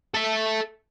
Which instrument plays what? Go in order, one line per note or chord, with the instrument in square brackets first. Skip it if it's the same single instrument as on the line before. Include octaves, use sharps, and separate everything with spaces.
[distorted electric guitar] A4 E5